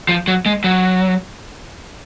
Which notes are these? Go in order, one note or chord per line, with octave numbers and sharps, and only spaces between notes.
F3
F#3
G#3
F#3